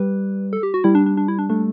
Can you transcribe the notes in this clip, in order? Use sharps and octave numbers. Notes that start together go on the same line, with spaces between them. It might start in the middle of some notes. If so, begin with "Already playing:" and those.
Already playing: G3 B4
A4
G4
F#4
G3 E4
D4
D4
D4
E4
D4
A3 D4